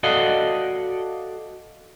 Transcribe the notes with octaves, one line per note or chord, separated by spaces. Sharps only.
F#4 A4 D5 D#5 F5 F#5